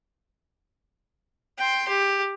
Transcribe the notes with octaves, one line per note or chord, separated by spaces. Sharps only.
G5 C6
G4